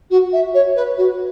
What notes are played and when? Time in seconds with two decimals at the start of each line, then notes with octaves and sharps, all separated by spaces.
0.10 F#4
0.32 E5
0.54 C#5
0.75 B4
0.97 F#4